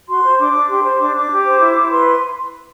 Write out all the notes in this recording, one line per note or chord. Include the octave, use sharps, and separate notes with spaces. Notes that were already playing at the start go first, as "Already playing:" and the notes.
F#4 C6
C5
D4 D6
D4
G4 C6
C5
D4 D6
D4 D6
G4
C5
E4
E4
B4 C6